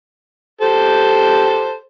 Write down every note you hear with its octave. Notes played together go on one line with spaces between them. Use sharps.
G4 A4 C5